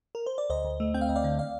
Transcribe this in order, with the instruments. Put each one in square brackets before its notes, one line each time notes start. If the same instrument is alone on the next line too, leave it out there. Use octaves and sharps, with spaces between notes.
[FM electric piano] A#4
C5
D5
D2 C5 D#5
D2
A3
C4 G5
F5
D2 D#5
D5 F5
D3
D5 F5